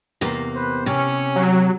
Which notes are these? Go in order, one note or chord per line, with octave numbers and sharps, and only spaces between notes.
E2 C3 A#3
B4 C5
C3 C#4
F#3